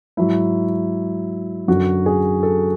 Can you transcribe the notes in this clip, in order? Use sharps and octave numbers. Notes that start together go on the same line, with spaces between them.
G#2 F#3 E4
F#2 D3 F#3 F#4
G#4
A4